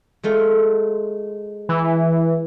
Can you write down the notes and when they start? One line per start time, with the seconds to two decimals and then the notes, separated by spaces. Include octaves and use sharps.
0.23 G#3 A3 F4
1.69 E3